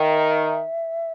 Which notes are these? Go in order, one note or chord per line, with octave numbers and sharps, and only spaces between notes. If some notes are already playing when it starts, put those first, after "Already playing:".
Already playing: D#3 E5